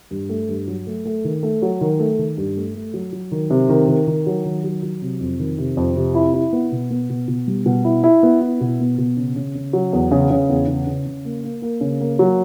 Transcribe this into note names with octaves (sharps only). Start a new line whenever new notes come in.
G2
A3
G2
F#3
A3
A3
D#3
A3
F#3
D#3
A3
D#3
G2
A3
A3
F#3
F#3
D#3
C3
D#3
D#3
D#3
F#3
D#3
F#3
F#3
C3
F2
D#3
C3
F2
C3
E4
E4
B3
B2
B3
B2
B2
G3
B2
E4
E4
B3
E4
B2
B3
B2
C#3
C#3
C#3
F#3
E2
C#3
C#3
E2
C#3
C#3
C#3
A#3
A#3
A#3
C#3
A#3
F#3